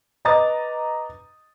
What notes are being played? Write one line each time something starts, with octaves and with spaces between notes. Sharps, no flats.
B4 D#5 A#5 D6 D#6 A6